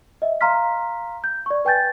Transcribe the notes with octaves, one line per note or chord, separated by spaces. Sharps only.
D#5 E5
F5 A#5 C6 F6 B6
G6
D5 C#6
B4 G5 G#5 G6 A6